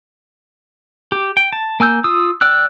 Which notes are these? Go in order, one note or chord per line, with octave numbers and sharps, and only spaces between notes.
G4
G5
A5
A#3 G#5 E6 G6
F4 D#6 E6
D5 G5 E6 F#6